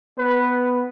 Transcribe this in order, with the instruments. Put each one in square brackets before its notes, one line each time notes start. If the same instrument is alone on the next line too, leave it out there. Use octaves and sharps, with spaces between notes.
[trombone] B3 [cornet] B4